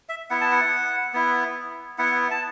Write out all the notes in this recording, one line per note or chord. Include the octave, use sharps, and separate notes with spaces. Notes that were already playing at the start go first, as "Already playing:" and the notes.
E5
B3 E4 F#5
A5
F#5
B3 E4
B3 E4 F#5
A5